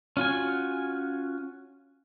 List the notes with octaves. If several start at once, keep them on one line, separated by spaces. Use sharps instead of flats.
C#4 F4 F#4 G#5